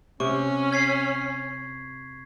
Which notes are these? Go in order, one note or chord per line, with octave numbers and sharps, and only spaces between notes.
C3 C#4 C#6
G#6 B6 C7